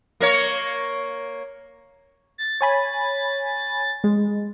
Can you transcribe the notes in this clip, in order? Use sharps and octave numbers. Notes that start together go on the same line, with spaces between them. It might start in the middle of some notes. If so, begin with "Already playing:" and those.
A#3 A#4 C#5
A6
C#5 G#5 B5
G#3